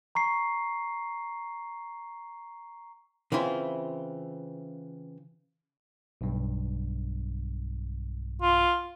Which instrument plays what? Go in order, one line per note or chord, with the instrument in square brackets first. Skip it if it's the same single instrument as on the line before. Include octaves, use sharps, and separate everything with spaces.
[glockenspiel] A#5 C#6 C7
[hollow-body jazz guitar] C#3 E3 C4 E4 F4
[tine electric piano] B1 G2
[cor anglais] F4